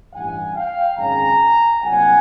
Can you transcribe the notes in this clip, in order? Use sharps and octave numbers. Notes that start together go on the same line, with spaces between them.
A1 G2 E3 G3 F#5 G#5
F5 G5
G#1 F#2 C#3 F#3 G#5 A#5
C2 A#2 F#3 F#5 G#5